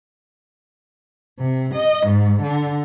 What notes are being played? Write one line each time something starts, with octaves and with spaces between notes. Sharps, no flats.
C3
D#5
G#2
D3